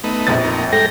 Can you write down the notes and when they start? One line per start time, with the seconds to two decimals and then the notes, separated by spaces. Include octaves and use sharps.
0.04 A3 B3 D#4
0.27 A#1 F2 A6
0.43 A#3 D#4
0.73 G#2 G3 A4 G5 A#6